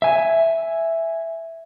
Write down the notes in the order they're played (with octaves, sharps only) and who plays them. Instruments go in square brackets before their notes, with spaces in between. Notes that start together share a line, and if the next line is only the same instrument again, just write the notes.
[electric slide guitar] E5 G#5